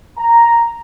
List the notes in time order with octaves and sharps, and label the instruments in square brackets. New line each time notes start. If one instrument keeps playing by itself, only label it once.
[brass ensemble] A#5